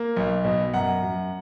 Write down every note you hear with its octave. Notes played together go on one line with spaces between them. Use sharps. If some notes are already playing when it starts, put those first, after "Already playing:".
Already playing: A#3
B1
B2
F#2 F#5 A#5
F#2